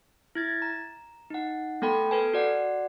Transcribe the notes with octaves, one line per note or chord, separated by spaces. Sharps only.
E4 G#6 A6
A#5
D#4 F#5
A3 B3 A4 G5 B5
A4 B4 G#5
F#4 D5 F#5